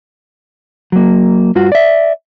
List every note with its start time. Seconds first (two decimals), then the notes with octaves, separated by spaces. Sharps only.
0.92 F#3 A#3
1.55 G2 F4 F#4
1.72 D5 E5